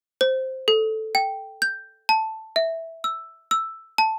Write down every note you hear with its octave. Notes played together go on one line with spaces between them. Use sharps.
C5
A4
G5
G6
A5
E5
E6
E6
A5